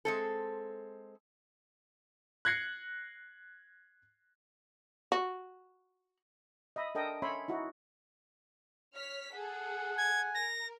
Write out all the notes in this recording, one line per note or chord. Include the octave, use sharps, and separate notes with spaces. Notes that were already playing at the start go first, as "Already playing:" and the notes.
G#3 C4 A4
F#6 G#6 A#6 C7 C#7
F#4
D#5 E5 B5
D4 A4 A#4 D#5 G5
C#4 A4 C#5 E5 B5 C6
D#4 E4 F#4
C#5 F6 B6
G#4 A4 F#5
G#5 G#6
A#4 A#6